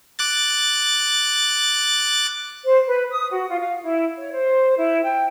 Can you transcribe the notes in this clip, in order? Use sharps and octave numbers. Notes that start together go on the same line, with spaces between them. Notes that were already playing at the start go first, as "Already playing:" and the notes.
D6 F#6 A6
C5
B4
D#6
F#4
F4
F5
E4
C#5
C5
E4
G5